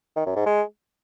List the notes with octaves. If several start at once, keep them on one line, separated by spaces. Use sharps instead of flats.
D#3
F#2
G#2
G#3